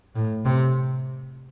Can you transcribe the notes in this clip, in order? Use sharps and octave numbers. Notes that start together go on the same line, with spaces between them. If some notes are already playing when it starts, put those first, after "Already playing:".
A2
C3